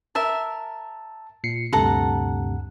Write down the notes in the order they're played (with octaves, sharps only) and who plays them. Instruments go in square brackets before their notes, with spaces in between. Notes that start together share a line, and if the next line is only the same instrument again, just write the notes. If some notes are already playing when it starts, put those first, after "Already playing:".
[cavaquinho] A#4 E5 [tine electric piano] A5
[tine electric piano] A#2 C7 C#7
[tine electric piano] D2 G2 C3 [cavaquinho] A4 F#5 A#5